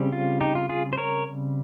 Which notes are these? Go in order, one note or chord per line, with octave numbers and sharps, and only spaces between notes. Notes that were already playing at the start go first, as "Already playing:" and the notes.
Already playing: C#3 G3 C4
F4
D#4 G4
F4
F4 G#4
C5
A#4 C#5